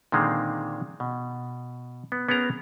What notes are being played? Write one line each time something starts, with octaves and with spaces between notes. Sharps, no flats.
A#2 D3 D#3 G#3 C4
B2
B3
B3 C#4 G#4 A#4 A#5